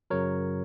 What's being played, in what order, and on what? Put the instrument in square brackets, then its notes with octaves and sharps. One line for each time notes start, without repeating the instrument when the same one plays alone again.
[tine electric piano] F#2 C#3 F#3 A#4 C#5